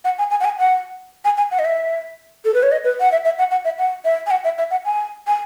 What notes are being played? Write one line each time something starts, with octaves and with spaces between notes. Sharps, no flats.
F#5
G#5
G#5
F#5
G#5
F#5
G#5
G#5
F#5
D#5
E5
A4
B4
C#5
D#5
B4
F#5
E5
E5
F#5
F#5
E5
F#5
E5
G#5
F#5
E5
E5
F#5
G#5
G#5